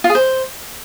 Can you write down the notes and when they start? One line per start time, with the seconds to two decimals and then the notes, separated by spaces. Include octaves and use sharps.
0.04 F4
0.10 G#4
0.15 C5